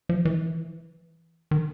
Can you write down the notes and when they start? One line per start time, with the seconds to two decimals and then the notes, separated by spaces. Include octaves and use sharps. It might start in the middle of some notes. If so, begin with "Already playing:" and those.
0.09 F3
0.25 E3
1.51 D#3